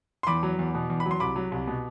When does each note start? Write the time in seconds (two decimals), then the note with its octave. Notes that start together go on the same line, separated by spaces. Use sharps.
0.23 C6
0.27 E2 B5 D6
0.43 F#3
0.59 E2
0.74 B2
0.90 E2
1.00 B5
1.06 F#3
1.11 C6
1.20 C2 B5 D6
1.36 F#3
1.52 C2
1.67 B2